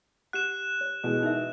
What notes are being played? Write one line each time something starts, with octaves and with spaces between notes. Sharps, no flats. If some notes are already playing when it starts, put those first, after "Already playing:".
G4 F#5 F#6 E7
C#5
B2 E3 G#3 D#5 G#5
D#4 A#4 E5